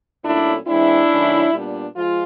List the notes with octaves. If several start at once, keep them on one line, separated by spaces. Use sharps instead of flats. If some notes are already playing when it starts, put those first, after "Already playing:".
A#2 F#3 A3 C#4 D4 E4
E3 G#3 C4 D4 E4
D#3 F#3 A3 C#4
A#2 G3 B3 D4
F3 G#3 F4